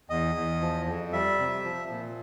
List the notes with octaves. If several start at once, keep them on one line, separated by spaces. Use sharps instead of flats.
E2 D#5
E2
F3
F2
G3 E5
C3
F3
A#2